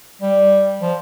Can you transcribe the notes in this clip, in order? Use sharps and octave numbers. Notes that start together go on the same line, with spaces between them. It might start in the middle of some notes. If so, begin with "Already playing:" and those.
G3
F3